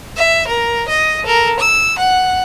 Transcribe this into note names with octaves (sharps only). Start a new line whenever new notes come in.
E5
A#4
D#5
A4 A#4
E6
F#5